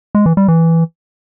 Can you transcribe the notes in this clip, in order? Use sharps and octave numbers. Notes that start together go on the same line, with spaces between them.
G#3
E3
G3
E3